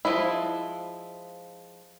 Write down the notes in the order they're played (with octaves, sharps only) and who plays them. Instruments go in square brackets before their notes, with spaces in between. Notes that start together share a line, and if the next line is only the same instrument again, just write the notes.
[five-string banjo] F3 G#3 E4